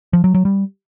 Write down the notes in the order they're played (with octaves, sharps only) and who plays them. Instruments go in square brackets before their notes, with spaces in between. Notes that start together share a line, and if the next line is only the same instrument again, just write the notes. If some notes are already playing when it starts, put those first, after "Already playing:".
[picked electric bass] F3
F#3
F#3
G3